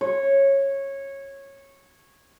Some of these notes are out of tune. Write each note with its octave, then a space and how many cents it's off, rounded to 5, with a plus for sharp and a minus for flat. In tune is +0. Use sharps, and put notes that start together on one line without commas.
C#5 -15